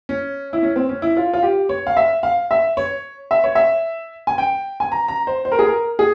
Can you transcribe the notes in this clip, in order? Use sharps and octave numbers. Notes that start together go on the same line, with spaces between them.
C#4
E4
C#4
C4
C#4
E4
F4
F4
G4
C#5
F5
E5
F5
E5
C#5
E5
C#5
E5
G#5
G5
G#5
A#5
A#5
C5
C5
A#4
G#4
A#4
G#4